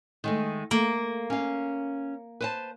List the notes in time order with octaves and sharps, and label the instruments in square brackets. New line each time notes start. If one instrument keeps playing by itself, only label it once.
[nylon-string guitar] D#3 G#3 A3
[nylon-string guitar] A3 [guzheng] A#3
[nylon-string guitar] C#4 F5
B4 C5 A5